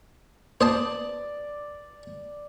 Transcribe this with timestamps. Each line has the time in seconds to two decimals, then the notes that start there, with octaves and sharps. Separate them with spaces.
0.61 C5 D5 D#5 A5